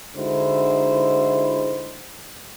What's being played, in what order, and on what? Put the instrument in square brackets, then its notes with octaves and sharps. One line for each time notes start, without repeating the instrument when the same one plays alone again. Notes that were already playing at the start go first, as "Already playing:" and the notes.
[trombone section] D3 G#3 D#4 E4 F#4 C5